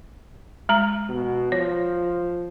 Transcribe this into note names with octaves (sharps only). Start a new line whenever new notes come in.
G#3 A#5
B2
F3 C#5